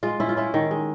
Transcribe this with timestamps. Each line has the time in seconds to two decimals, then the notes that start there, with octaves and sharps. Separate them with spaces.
0.03 G#3 F4
0.20 C#4 E4
0.29 F4
0.37 C#4 E4
0.54 D#3
0.71 G#3